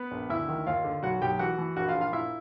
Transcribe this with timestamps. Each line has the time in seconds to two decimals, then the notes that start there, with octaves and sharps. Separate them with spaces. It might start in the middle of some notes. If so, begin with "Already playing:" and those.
Already playing: B3 B4
0.11 A#1
0.30 D2 E4 E5
0.49 D#3
0.67 D#2 F4 F5
0.84 D3
1.03 B1 F#4 F#5
1.21 B1 G4 G5
1.39 E3 F#4 F#5
1.58 E3
1.76 A#1 F#4 F#5
1.88 F4 F5
1.95 A#1
2.01 F4 F5
2.13 A#2 E4 E5